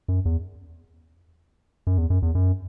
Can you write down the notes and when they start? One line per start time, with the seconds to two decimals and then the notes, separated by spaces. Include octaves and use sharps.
0.08 F#2
0.25 E2
1.87 F#2
1.98 E2
2.10 F#2
2.22 E2
2.35 F#2